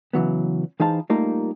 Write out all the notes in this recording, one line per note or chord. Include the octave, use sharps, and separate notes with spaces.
C#3 E3 F#3 B3
E3 D#4 G#4 C5 F5 A5
G3 A3 A#3 D#4 F4